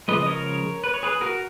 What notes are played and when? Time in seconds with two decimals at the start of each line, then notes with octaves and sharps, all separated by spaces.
0.08 C#3 F3 G#3 B4 D#5
0.22 D#5
0.26 A#4 C#5
0.84 B4
0.94 C#5
1.03 G#4 B4
1.21 F#4 A#4